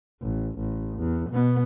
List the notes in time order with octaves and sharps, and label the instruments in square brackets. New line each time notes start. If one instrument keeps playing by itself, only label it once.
[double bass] A1
A1
E2
B2 B3